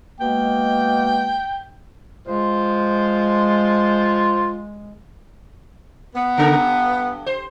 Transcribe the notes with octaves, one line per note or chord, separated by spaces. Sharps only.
B2 G#3 A#3 G5
G#3 F4 C5
B3
C#3 A4 A#4
G2
C5